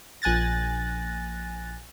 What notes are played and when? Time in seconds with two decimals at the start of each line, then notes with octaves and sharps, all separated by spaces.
0.22 A#1 G#5 F#6 A6 A#6